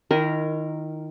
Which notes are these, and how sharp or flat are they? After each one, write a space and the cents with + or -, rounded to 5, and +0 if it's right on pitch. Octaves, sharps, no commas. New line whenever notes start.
D#3 +0 E4 +35 A#4 -5